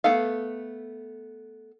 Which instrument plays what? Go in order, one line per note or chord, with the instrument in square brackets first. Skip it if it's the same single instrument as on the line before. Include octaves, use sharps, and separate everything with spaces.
[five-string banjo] A3 B3 A4 F5